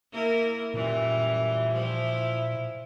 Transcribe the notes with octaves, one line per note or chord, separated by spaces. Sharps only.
A#3 E4 A#4
F#2 A#2 E3 G3
F3 E4